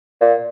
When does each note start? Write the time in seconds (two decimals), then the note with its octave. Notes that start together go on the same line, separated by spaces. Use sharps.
0.21 A#2